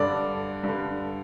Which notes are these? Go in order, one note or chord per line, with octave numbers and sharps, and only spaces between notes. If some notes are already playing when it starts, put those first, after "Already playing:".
Already playing: G2 D3 D5
G2 D3